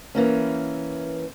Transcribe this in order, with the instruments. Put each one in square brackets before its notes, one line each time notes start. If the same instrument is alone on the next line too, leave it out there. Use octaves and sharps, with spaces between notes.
[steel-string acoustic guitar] E3 A#3 C#4